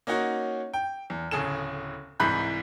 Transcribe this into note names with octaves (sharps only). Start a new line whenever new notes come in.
A#3 C#4 D#4 F#4 C#5
G5
E2
D1 C#3 G#4 A4 E7
C2 G#2 E3 B5 F#6 G6